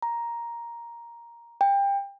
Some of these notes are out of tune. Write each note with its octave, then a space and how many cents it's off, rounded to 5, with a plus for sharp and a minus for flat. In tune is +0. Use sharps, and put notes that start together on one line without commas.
A#5 +5
G5 +25